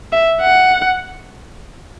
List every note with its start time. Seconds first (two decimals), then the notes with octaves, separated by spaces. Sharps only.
0.12 E5
0.41 F#5